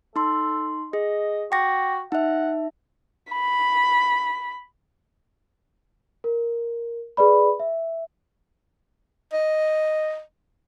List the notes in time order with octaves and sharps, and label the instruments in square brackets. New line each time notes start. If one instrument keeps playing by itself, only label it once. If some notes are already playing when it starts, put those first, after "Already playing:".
[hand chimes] D#4 C6 [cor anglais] A4
[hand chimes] G#4 [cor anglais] D#5
[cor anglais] F#4 [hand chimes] G5 D6 A#6
[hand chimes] D#4 E5 [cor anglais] F#5
[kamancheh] B5
[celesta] A#4
G#4 B4 D5 B5
E5
[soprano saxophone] D#5